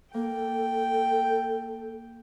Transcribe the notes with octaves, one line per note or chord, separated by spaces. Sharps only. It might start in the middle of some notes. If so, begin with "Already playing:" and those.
A#3 A4 G5